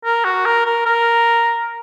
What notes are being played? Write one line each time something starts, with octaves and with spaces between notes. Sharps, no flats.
A#4
F#4
A#4
A#4
A#4